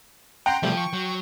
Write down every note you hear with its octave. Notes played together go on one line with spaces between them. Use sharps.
F#5 G5 A#5 C6
C3 F3 G3 A3
C#6
F#3